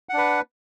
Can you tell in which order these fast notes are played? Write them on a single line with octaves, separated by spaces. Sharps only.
F#5 D4 B4